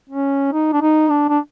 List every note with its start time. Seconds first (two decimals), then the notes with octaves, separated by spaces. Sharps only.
0.10 C#4
0.53 D#4
0.73 D4
0.81 D#4
1.10 D4
1.29 D4